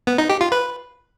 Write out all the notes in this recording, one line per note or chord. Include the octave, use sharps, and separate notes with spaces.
B3
D#4
G4
F4
B4